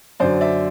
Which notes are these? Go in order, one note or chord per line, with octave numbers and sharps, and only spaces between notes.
F#2 D3 F#3 C5 D5
D5 E5